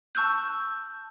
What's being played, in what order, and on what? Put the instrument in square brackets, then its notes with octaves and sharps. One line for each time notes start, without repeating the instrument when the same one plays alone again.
[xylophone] A5 C#6 E6 F#6 G6